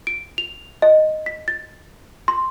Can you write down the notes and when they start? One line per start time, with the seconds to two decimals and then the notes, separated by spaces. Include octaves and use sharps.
0.07 D7
0.38 F7
0.82 D#5
1.26 B6
1.48 A6
2.28 C6